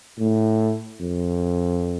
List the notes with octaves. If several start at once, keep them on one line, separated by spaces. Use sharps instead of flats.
A2
F2